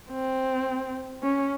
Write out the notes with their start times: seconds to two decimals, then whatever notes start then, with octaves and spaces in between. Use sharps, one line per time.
0.11 C4
1.23 C#4